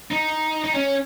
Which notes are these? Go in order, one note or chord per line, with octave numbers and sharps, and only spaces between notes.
D#4
D#4
C#4